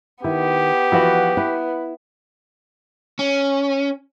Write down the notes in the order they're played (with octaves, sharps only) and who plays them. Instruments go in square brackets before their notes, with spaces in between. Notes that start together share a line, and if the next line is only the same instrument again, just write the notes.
[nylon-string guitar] D#3 [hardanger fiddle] B3 [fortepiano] E4 [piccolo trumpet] G4
[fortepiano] E3 F#4 B4 [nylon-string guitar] F3 F4
[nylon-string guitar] E4 [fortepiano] B4
[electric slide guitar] C#4